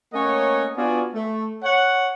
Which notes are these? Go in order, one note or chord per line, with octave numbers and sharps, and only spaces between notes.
A3 A#3 C#4 C#5 D#5 F#5
B3 D4 F4 F#4 D5 G#5
A3
C#5 F#5